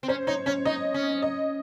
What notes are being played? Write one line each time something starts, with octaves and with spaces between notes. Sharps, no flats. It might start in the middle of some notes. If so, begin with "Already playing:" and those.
C4
C#4 C5
D#4 C#5
C#4 C#5
D#4 D#5
C#4
D#5